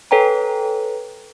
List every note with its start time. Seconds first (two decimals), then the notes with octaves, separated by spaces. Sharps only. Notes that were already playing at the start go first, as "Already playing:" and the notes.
0.11 A4 B4 C#5 G5 G#5 A#5